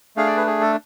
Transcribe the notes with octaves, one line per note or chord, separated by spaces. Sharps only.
A3 D4 G#4 F5
D5
B4
G#4
A4